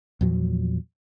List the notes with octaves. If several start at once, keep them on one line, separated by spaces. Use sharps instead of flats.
E2 A#2 F3 F#3